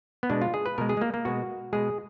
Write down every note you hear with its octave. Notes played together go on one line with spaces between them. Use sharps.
B3
B2 G#3 D4
F4
G#4
B4
B2 G#3 A#4
G#4
G#3
A#3
A#3
B2 G#3 F#4
B2 G#3 G#4